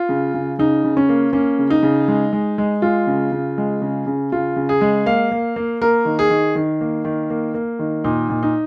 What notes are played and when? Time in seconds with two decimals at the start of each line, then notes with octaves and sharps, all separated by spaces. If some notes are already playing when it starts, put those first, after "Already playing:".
Already playing: F4
0.09 C#3
0.34 C#3
0.59 C#3 D#4
0.84 C#3
0.97 C#4
1.09 A#3
1.33 A#3 C#4
1.59 C#3
1.70 D#4
1.83 C#3
2.08 G#3
2.33 G#3
2.58 G#3
2.82 G#3 F4
3.07 C#3
3.32 C#3
3.58 G#3
3.82 C#3
4.07 C#3
4.32 C#3 F4
4.56 C#3
4.69 G#4
4.81 G#3
5.06 A#3 F5
5.31 A#3
5.56 A#3
5.81 A#3 A#4
6.05 D#3
6.19 G#4
6.30 D#3
6.55 D#3
6.81 A#3
7.05 D#3
7.30 A#3
7.54 A#3
7.79 D#3
8.04 A#2 D#4
8.30 A#2
8.43 D#4